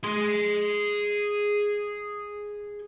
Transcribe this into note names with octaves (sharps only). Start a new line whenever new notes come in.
G#4 C6